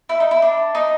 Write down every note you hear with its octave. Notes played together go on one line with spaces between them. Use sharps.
E4
D#4
E4
D4
D#4